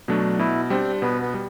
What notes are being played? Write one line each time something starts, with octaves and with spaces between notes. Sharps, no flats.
B2 F#3 A3 D4
B2 E4
G3 C4 D4
B2 B3
B3
G3